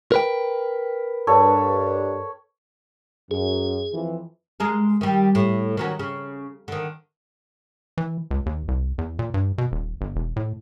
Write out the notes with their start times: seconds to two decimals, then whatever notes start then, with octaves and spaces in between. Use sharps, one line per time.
0.12 A#4 B4 G5
1.27 G2 A4 C#5
3.31 F#2 G#4
3.94 F2 E3
4.60 G#3 G#4 A#4
5.01 D#3 G3
5.35 A2
5.77 D#3 F#3 C#4
5.99 C#3
6.68 D3 D#3
7.98 E3
8.31 C#2
8.46 D#2
8.68 C2
8.98 E2
9.19 A#2
9.34 G2
9.58 B2
9.72 D#1
10.01 G1
10.16 E1
10.36 A2